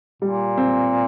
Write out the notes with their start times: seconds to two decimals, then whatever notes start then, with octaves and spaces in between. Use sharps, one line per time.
0.22 A#2 G3
0.58 C4